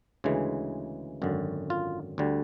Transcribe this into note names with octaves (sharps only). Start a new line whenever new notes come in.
D2 C#3 E3 G#3
G#1 F#2 D3
F4
D2 D3 G3